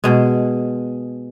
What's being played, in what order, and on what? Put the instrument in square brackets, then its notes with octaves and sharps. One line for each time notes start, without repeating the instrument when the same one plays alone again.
[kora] B2 G#3